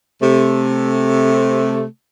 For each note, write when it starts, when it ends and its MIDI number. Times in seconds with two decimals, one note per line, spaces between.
0.22 1.84 48
0.22 1.84 57